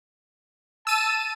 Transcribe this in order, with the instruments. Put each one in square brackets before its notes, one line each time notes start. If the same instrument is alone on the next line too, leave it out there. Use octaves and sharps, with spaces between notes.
[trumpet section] A5 [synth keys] E6 D#7